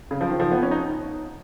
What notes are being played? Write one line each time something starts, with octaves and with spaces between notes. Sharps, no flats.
C#3
F3
D#3
F3
B3
C#4
D#4